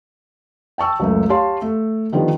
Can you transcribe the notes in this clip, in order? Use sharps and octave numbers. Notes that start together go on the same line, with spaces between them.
G5 A5 C#6 E6
C#2 F#2 A3
G4 C#5 F5 A5 C6
A3
D3 D#3 F3 G3 B3